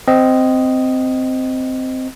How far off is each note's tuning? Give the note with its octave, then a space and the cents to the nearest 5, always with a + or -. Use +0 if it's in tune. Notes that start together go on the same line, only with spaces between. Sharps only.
C4 -10 D#5 +0